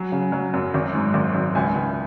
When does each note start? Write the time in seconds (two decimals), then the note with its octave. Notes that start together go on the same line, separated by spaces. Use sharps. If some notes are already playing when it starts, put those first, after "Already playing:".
Already playing: F#3 G#5
0.12 C#3
0.32 F#3
0.54 F#2
0.74 G#1
0.95 G#2
1.14 G#1
1.35 G#1
1.55 C#2 E5 G#5
1.75 C#2